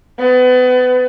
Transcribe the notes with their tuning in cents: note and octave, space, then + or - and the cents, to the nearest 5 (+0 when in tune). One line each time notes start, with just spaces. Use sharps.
B3 +30